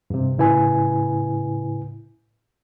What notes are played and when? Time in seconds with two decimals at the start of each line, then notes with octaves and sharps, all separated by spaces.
0.10 G2 C3
0.38 A2 C#3 E4 B4 G#5